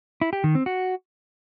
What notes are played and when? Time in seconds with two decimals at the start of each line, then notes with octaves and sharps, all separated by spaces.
0.21 E4
0.33 G4
0.44 D#3
0.55 C4
0.66 F#4